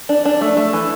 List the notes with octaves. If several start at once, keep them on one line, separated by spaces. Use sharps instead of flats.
D4
D4
A3
A3
E3